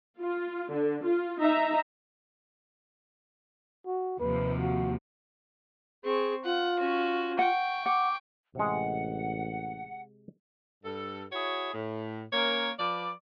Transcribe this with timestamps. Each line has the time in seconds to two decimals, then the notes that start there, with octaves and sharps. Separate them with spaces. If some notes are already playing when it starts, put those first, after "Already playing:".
0.20 F4
0.70 D3
1.04 F4
1.40 D#4 E5 A#5
3.87 F#4
4.20 D#2 C3 F3 B4
4.58 F#4
6.04 C4 G#4 C#6
6.44 F4 F#5
6.79 C#4 F#4
7.39 F#5 G5 C#6
7.86 F#5 D6
8.55 A1 C3 G#3 F#5
10.84 G2 A4
11.32 E4 F#4 G#4 C#5
11.73 A2
12.33 A#3 C#4 A#4 C#5
12.79 F3 B4 D5